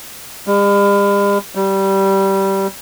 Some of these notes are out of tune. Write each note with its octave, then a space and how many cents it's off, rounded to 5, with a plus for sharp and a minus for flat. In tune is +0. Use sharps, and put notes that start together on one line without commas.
G3 +45
G3 -15